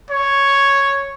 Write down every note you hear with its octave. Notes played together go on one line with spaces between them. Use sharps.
C#5